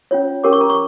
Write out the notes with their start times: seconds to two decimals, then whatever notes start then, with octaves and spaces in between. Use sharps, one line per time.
0.11 C#4 F4 C#5
0.44 C#4 G4 A#4 C#5 D6
0.53 C#6
0.61 A#5
0.70 C#6